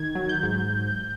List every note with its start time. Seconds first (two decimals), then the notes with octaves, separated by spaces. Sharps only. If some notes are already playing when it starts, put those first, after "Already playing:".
Already playing: D#3 G#6
0.15 F#3
0.29 G6
0.43 G#2